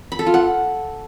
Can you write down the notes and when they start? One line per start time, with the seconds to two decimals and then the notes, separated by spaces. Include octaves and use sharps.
0.12 B5
0.19 A4
0.26 F4
0.34 F#5